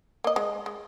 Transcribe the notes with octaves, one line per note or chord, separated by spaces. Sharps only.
A#3 D#5
G#3
G#3